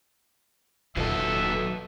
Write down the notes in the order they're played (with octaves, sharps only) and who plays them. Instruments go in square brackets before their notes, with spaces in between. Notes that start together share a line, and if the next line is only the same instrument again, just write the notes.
[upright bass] D#1 F4 [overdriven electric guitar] D#2 A4 [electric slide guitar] F#3 B4 D#5 [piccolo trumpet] E5